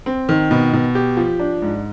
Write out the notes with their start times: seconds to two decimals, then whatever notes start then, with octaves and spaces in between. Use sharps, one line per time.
0.06 C4
0.29 D#3
0.51 B2
0.73 B2
0.95 G4
1.17 F3
1.39 D4
1.62 G#2